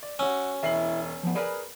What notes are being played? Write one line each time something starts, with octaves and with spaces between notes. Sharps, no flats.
D5
C#4 F#4 E6
E1 E4 E5 C7 F#7
F3 B3
G#4 A#4 B4 D5 G#5 B5